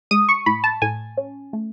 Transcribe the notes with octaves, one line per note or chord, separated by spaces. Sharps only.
G#3 D#6
C#6
A2 B5
A5
A2 G#5
C#4
A3